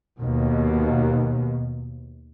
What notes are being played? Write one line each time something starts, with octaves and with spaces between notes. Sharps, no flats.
D#2 B2